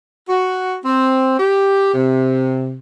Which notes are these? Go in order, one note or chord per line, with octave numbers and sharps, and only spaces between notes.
F#4
C4
G4
C3